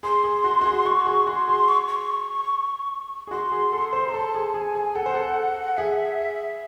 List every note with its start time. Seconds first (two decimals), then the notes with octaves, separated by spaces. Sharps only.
0.03 G#4 C6
0.24 G#4
0.44 F#4
0.61 F#4
0.65 G#4
0.85 F#4 C#6
1.06 G#4
1.27 F#4 C6
1.48 G#4
1.68 C#6
1.88 C#6
3.27 G#4
3.31 F#4 C6
3.52 G#4
3.72 A4
3.93 C5
4.08 C5
4.13 A4 A5
4.35 G#4
4.54 G#4 G#5
4.75 G#4
4.95 A4 F#5
5.06 C5
5.15 A4
5.77 G#4 E5